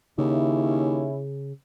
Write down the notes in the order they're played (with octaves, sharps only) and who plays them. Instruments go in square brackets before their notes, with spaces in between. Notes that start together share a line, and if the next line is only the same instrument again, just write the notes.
[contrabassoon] D#2 [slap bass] C#3 [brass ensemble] C#4 E4